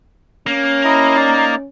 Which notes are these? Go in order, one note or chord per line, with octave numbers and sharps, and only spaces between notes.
A#3 C#4
E4 D#5 A#5
D#4 D5